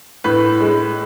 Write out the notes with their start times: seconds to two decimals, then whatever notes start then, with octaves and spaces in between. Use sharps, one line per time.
0.24 A2 B4
0.61 G#3